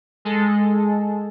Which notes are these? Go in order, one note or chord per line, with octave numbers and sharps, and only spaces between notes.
G#3 A4